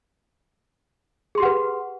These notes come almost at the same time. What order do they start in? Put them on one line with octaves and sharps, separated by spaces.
G#4 C6 G4 F#5 B4